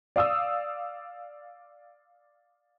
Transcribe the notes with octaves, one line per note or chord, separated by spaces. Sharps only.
D5 F5 D#6 E6